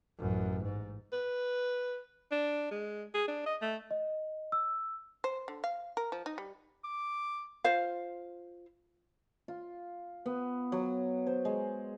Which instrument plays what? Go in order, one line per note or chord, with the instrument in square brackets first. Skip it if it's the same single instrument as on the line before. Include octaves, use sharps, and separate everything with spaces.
[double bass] A1 F#2
G#2
[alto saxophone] B4
D4
G#3
G#4
D4
D#5
A3
[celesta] D#5
E6
[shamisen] C5
D3
F5
A#4
F3
D#4
G3
[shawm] D6
[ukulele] F4 C5 F5
[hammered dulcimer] F4
B3
F#3
C5
G#3